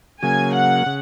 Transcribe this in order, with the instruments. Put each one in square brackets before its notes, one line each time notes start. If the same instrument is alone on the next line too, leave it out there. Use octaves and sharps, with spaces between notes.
[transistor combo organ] C#3 F#3 A#3 [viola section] G#5
[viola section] F#5
[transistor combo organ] C#3